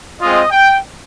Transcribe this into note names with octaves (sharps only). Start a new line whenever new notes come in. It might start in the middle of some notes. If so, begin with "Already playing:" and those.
G#3 C4 F4 D#5
G5